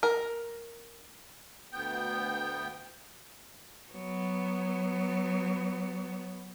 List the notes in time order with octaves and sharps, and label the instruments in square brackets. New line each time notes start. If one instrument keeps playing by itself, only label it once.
[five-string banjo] A#4
[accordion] D2 B3 G5
[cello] F#3 B3